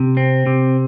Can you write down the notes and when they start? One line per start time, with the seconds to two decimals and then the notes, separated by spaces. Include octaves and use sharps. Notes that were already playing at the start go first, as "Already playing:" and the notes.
Already playing: C3
0.17 C4
0.47 C3